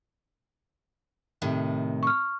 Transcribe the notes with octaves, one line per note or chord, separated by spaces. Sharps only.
A2 C3 D#3
C#6 F6